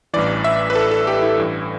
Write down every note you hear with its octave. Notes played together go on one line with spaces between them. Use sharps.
A1 G2 E3 D5
E5
B4
A4
A4
G4
E4
A1 G2 E3